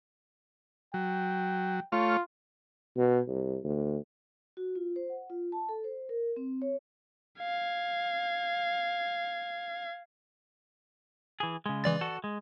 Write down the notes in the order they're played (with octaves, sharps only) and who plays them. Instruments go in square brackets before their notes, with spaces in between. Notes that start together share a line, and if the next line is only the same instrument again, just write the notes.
[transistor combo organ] F#3 [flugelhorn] G5
[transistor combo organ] A3 C#5 F6 [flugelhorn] F4
[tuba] B2
C2
D2
[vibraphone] F#4
F4
C5
F#5
F4
A5
A4
C5
A#4
C4
C#5
[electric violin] F5 G#6
[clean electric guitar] E3 G#4
C#3 G#3
[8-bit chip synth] E3 D5 A6
[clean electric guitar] F#4 A4
G#3